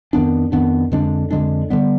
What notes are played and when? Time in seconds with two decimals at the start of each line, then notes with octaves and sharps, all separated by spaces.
0.13 F2 D#3 B3 D4
0.52 F2 D#3 B3 D4
0.92 F2 D3 G#3 D4
1.31 F2 D3 G#3 D4
1.70 D3 G3 B3